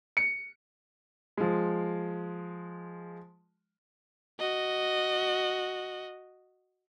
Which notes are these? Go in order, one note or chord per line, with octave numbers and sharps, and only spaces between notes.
C#7
F3 G#3
F#4 D#5